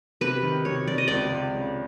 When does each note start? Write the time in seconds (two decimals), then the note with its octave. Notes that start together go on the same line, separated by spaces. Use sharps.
0.21 C3 B4
0.43 D#3
0.65 C3 C#5
0.87 C3 D5
0.98 D#5
1.08 C#2 D5
1.32 C#2
1.55 C#3